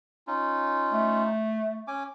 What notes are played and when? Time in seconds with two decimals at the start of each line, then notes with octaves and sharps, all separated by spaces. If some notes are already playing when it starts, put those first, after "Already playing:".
0.27 C#4 D#4 F4
0.93 A3
1.87 C#4 G#5 D6